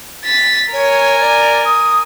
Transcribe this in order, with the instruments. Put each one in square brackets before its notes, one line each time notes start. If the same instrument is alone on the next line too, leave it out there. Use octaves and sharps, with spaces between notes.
[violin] A6 B6
[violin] A#4 G#5 [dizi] C#5
[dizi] D5
D#6